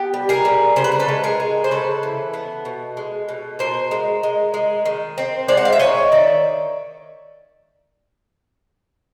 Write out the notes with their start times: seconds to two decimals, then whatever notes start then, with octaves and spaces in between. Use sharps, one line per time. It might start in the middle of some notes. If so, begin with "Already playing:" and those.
Already playing: B3 G4
0.14 G3
0.29 G#4 A#4
0.45 G3
0.76 C#3 C5
0.84 B4
0.92 A#4
0.99 A4 B4
1.08 G#3
1.24 G#4 A#4
1.40 G#3
1.64 C5
1.71 C#3 A4 B4
2.03 E3
2.34 B3
2.65 B2
2.97 G#3
3.29 B2
3.59 B2 A#4 C5
3.91 G#3
4.23 G#3
4.54 G#3
4.85 D#3
5.18 C4
5.48 G#3 C5 D5
5.57 F#5
5.65 F5
5.72 E5
5.79 D#3 C#5 D#5
6.12 D#3 D5 E5